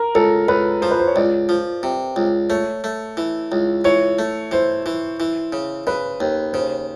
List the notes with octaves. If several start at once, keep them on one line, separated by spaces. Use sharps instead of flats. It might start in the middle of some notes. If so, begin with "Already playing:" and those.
Already playing: A#4
C#2 A4
C#2 B4
F3 C5
B4
C5
C#5
C#2 D5
F3
C3
C#2
A3 C#5
A3
E3
C#2
E3 C#5
A3
E3 C5
E3
E3
C#3
C#3 B4
D#2
C#3 C5